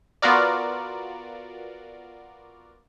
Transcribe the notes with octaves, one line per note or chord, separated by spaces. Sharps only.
B3 F4 F#4 A#4 D5